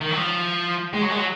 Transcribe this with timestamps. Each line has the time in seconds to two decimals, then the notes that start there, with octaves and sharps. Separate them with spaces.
0.01 D#3
0.11 F#3
0.17 F3
0.93 G#3
1.01 F#3
1.10 G#3
1.18 F#3